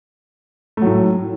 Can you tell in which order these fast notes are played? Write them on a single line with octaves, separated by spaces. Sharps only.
A3 F#3 A2